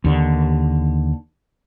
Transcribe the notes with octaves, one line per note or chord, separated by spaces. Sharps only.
D#2 D3